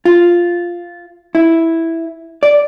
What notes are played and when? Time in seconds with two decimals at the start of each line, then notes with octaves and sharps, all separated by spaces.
0.05 F4
1.35 E4
2.43 D5